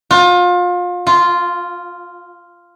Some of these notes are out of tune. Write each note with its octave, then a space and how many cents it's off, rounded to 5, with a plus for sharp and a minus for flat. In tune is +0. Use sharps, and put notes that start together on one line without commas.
F4 +30
F4 -5